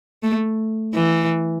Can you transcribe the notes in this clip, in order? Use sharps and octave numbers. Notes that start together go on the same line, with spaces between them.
A3
E3